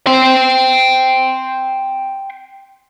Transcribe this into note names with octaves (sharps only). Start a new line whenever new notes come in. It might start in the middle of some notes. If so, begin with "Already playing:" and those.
G5 C6